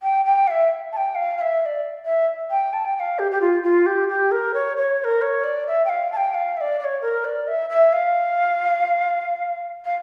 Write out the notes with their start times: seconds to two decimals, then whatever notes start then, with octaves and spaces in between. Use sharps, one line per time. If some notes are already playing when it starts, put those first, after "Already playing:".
0.03 G5
0.25 G5
0.47 F5
0.51 E5
0.92 A5
0.97 G5
1.15 F5
1.38 F5
1.41 E5
1.61 E5
1.65 D5
2.05 E5
2.50 G5
2.73 A5
2.85 G5
2.96 G5
3.00 F5
3.19 G4
3.31 G4
3.41 F4
3.63 F4
3.86 G4
4.09 G4
4.31 A#4
4.54 C#5
4.77 C#5
4.99 C#5
5.04 A#4
5.22 C#5
5.44 D5
5.67 E5
5.85 G5
5.89 F5
6.12 A5
6.17 G5
6.34 F5
6.57 E5
6.61 D5
6.79 D5
6.84 C#5
7.02 A#4
7.25 D5
7.48 E5
7.70 E5
7.93 F5
9.85 F5